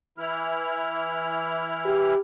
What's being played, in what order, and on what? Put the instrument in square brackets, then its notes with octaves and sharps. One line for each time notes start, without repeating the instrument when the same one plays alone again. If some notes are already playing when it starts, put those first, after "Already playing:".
[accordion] E3 E4 F6
[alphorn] G4